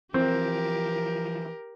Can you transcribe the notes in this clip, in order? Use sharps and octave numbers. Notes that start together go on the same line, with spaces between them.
E3 F3 C4 G4 A#4